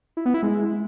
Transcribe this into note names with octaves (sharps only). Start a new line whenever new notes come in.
E4
B3
E4
G#3